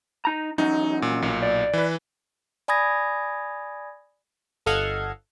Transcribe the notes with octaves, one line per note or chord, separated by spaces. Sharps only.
D#4 A#5
E2 F#3 C#4 D#4
A#2
B1 A#2
D5
E3 B4
D5 G#5 B5 D#6 G#6 A#6
G1 A4 D#5 F5 F#5 G#6